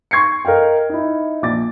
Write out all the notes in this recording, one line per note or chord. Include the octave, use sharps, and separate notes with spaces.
C6 C#6 G#6 C7 C#7
A#4 D#5 F5 G5
D#4 E4
A#1 D6 A6